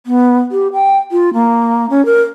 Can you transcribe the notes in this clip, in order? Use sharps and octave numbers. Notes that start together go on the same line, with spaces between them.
B3
G4
G5
F4
A#3
C#4
A#4